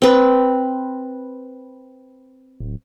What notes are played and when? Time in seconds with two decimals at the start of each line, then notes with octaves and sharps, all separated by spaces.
0.02 C4 B4
2.60 D1